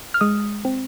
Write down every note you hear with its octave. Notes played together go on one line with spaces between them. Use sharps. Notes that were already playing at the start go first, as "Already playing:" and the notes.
F6
G#3 D#6
C4